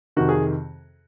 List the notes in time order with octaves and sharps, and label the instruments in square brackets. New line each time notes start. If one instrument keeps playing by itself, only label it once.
[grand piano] F2 C3 D#3 F#4
G#4